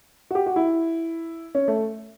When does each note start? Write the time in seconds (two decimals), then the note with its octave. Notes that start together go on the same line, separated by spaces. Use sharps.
0.31 F#4
0.35 G4
0.46 F#4
0.56 E4
1.55 C#4
1.68 A3